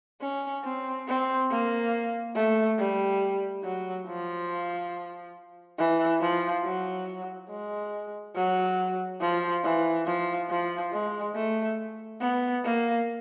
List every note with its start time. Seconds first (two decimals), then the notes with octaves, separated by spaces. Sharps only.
0.21 C#4
0.64 C4
1.07 C4
1.50 A#3
2.35 A3
2.79 G3
3.63 F#3
4.06 F3
5.78 E3
6.21 F3
6.64 F#3
7.50 G#3
8.35 F#3
9.21 F3
9.64 E3
10.06 F3
10.50 F3
10.92 G#3
11.35 A3
12.21 B3
12.64 A#3